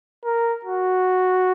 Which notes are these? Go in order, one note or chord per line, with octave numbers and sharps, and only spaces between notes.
A#4
F#4